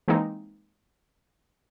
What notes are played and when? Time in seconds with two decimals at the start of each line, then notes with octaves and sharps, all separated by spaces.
0.08 E3 G#3 A#3 C4 D#4